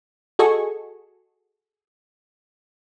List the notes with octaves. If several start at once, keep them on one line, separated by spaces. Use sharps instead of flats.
F#4 G#4 A4 D#5 G#5 C#6